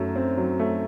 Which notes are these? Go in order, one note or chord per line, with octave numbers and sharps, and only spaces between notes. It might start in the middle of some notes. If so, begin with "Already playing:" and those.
Already playing: F#2 F#3 A3
C4
F#3
A3